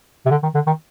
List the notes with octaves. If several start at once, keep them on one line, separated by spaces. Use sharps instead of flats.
C3
D3
D#3
D3
D#3